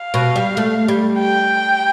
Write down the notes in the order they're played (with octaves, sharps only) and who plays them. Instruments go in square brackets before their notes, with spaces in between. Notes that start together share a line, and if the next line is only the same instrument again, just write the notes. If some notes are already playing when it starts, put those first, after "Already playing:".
Already playing: [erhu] F5
[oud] B2
G3
A3
G3
[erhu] G5